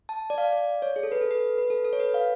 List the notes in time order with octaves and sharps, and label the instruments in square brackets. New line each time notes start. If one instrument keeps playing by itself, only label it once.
[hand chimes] A5
D5
F5
D5
C#5
G#4
A4
B4
A4
B4
B4
A4
A4
C#5
B4
F5